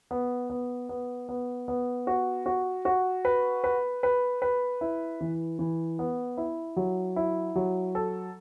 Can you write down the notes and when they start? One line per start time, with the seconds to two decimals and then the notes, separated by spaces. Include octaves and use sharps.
0.11 B3
0.50 B3
0.89 B3
1.29 B3
1.68 B3
2.07 F#4
2.46 F#4
2.85 F#4
3.25 B4
3.64 B4
4.03 B4
4.42 B4
4.81 E4
5.21 E3
5.59 E3
5.99 B3
6.37 E4
6.76 F#3
7.16 E4
7.56 F#3
7.95 A4